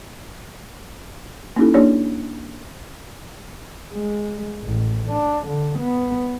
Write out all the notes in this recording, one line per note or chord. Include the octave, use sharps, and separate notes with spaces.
A#3 C#4 D#4 E4 G4 A4
A#3 D4 G4 C#5 D5
G#3
A1
D4
D3
B3